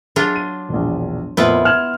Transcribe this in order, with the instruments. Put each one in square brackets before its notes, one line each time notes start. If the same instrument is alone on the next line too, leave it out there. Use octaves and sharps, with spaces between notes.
[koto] F#3 D4 F4 [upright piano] G#4 G7
[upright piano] D#7
E1 A#1
[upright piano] F2 A#2 [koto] B3 E4 F4
[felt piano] F6 [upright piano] G#6 E7 F#7